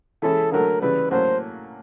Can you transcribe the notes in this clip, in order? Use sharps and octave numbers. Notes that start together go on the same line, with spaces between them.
E3 G#3 C#4 E4 G#4 A4
D3 F#3 A3 A#4
C#3 E3 G3 B4
A2 F#3 A#3 C#4 C5